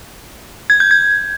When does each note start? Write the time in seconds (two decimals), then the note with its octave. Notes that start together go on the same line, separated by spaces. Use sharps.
0.70 G#6
0.80 G6
0.91 G#6